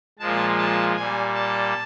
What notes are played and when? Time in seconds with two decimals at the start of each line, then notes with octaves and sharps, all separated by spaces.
0.19 A#2 F3 G#3 A5
0.58 A5
0.96 A#2 G3 G#5
1.35 A5